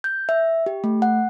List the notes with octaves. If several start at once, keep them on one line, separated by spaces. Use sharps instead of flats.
G6
E5
G4
A3
F#5